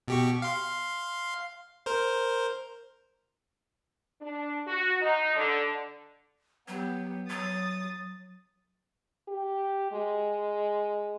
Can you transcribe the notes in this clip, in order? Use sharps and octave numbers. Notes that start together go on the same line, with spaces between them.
B2 G4 C#6
F5 C6
A#4 C5
D4
F#4
D#4
D3
F#3 B3 G4
F#3 D#6 A6
G4
G#3